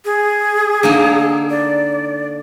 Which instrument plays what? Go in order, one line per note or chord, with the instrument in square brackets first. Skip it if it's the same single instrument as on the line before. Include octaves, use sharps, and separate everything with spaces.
[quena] G#4
[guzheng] D3 A#3 D#4
[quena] D5